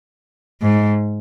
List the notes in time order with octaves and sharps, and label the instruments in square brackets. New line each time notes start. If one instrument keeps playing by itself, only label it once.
[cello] G#2